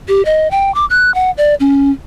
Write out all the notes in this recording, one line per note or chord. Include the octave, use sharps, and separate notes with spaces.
G4
D#5
G5
D6
F#6
F#5
D5
C#4